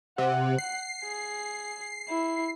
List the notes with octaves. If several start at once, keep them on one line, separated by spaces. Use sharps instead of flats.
C3 F#5
C7
G#4
E4